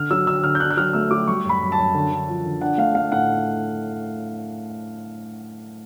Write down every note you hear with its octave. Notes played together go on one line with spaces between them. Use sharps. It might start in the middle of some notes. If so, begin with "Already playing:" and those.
Already playing: D3 F6
F#3 E6
D3 E6
D3 F6
G6
D4 F#6
F#6
F#3 F6
A3 E6
F#3 D6
G3 C#6
F#2 B5
F#2
A5
F#2
D3
D3
F3
D3
D4 F#5
A3 F5
A3 F5
A2 F#5